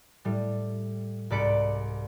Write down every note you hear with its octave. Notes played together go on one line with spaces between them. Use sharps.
A2 G3
C2 G#2 D5 B5 C#7 D7